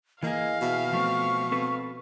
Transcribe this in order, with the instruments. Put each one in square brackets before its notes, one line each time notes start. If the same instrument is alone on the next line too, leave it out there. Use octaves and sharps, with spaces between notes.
[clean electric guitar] E3 G#4 [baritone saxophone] A#3 [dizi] D#5 [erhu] F5
[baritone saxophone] B2 [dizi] E5
[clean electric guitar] F3 A3 C4 [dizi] C#6
[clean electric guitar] C4 A4 B4